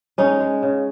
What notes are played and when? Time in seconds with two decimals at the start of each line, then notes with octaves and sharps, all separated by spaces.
0.18 G#3 C#4 D#4
0.40 G#3
0.62 C#3